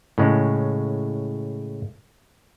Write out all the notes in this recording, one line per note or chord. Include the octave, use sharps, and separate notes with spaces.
A2 C#3 G#3